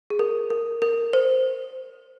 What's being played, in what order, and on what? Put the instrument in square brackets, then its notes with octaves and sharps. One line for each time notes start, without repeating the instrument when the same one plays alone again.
[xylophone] G#4
A#4
A#4
A#4
C5